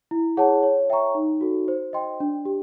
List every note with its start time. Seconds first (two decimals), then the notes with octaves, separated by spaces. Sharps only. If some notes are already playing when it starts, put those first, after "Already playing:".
0.11 E4
0.37 G#4 C#5 F#5 A5
0.63 C#5
0.90 E5 G5 A#5 C#6
1.15 D#4
1.41 F#4 A4
1.68 C5
1.93 D#5 G5 C6
2.20 D4
2.45 G4